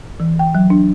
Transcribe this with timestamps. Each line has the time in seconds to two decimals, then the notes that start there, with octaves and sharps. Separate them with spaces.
0.20 E3
0.39 G5
0.55 F#3
0.70 D4